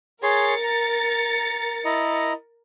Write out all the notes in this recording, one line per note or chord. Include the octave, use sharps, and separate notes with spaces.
G#4 A#4 C#5 C6 A6 C#7
A#5
E4 D#5 A#5